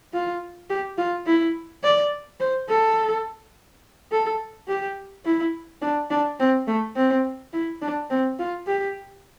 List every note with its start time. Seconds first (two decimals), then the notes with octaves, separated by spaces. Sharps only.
0.13 F4
0.70 G4
0.98 F4
1.26 E4
1.83 D5
2.40 C5
2.69 A4
4.12 A4
4.68 G4
5.25 E4
5.82 D4
6.10 D4
6.39 C4
6.67 A3
6.96 C4
7.53 E4
7.82 D4
8.10 C4
8.39 F4
8.67 G4